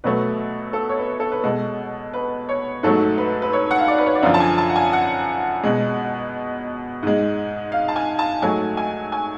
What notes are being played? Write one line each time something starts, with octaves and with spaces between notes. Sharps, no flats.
B2 F#3 A3 B4
A4
C#5
B4
A4
B4
B2 G#3 A4
B4
C#5
G#2 F#3 A3 A4
B4
B4
C#5
F#5
F5
D5
B4
C#5
D5
F#2 D3 F3 F5
A5
G#5
A5
F#5
G#5
F#5
B2 G#3
G#2 G#3
F5
A5
G#5
A5
G#2 F#3 A3 G#5
G#5
G#5